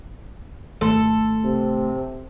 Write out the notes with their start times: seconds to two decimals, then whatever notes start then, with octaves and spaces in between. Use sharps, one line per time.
0.81 G#1 A3 A4 C6
1.44 C3